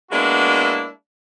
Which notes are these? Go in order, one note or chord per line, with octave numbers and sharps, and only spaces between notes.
G#3 A#3 B3 D4 E4 F#4